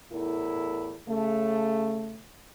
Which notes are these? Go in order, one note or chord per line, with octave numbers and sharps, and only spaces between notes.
E2 A2 E4 A#4
C#3 A3